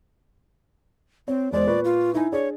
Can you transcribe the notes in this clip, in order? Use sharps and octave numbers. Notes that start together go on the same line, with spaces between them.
C4 C#5
E1 G#3 C5 D5
A#2 B4 C#6
F4
D#4 E4 G#5
D4 G#4 C#5 D5